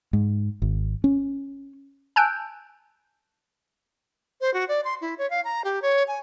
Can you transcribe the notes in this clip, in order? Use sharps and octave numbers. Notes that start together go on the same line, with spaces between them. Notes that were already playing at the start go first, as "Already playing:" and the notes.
G#2
G#1
C#4
G#5 A5 E6 F#6 G6 D7
C5
F#4
D5
C6
E4
C#5
F5
A#5
G4
C#5
G#5